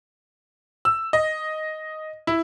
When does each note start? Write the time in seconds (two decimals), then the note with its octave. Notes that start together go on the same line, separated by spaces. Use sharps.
0.85 E6
1.13 D#5
2.27 E4